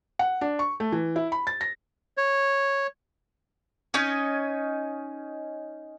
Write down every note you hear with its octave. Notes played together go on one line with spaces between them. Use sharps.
F#5
D4
C#6
A3
E3
E4
B5
A6
A#6
C#5
C#4 D#4 C#5 D#5